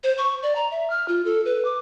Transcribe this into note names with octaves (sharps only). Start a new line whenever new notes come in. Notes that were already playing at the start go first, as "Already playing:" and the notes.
C5
C#6
D5
A#5
E5
F6
F4
A4
B4
D6